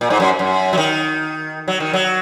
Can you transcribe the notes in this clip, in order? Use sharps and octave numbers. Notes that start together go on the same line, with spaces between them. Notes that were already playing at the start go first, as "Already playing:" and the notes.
A#2
G#2
F#2
F#2
F#3
D#3
F#3
D#3
F#3